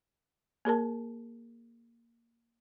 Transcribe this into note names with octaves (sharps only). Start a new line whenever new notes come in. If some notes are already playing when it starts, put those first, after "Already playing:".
A#3 G#4 A#4 A5